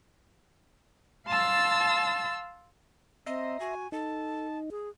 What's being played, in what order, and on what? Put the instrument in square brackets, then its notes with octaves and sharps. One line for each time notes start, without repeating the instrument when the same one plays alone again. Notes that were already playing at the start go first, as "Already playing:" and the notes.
[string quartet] F5 A5 C6 E6 A6
[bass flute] C4 [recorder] D#5 [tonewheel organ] E5 A#5 C6
[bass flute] F#4 [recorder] G#5
[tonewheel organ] D#4 [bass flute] A4 [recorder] A5
[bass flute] G#4